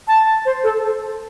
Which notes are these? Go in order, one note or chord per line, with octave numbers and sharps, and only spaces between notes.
A5
C5
A4